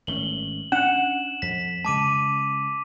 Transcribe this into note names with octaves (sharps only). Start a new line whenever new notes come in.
G#1 A3 C#4 F#7 G7
C#4 D4 F#5 E7 F#7
F2 B6
C#3 G#3 A5 D6 D#7